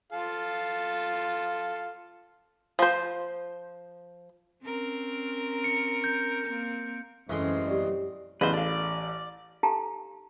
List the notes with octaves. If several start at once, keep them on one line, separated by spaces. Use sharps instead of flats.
F4 A4 F5
F3 C5
C4 C#4 A#4
C#7
G6
A#3 C4 A#4
A1 F#2 G#3 C4 C6
G4 D5
A1 G#3 B3 B4 C5
A4 D5 F5
D#4 G4 A4 F5 A5 A#5